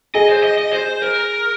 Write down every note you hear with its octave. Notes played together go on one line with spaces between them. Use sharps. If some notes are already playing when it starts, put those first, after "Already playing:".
G#4 D#5
C5
D#5
D#5
C5
A#4